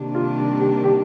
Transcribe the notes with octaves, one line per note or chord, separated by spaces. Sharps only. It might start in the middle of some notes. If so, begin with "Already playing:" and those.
Already playing: C3 D#3 G3 A#3 D4
F4
G4
G4